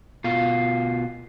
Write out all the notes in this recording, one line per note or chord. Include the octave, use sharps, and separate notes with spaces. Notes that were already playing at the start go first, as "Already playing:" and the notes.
B2 F4